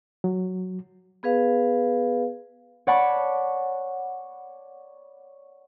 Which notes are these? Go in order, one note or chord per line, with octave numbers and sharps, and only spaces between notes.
F#3
B3 G#4 B4 F5
C#5 D5 F#5 A5 B5 C#6